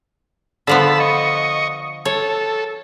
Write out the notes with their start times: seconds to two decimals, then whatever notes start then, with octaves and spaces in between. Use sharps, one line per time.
0.67 D3 F3 B3 A5 B5 E6
1.00 D#5 C#6
2.05 A4 C#5